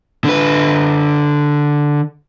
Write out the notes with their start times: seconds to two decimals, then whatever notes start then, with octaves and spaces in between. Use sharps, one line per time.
0.24 D3 B4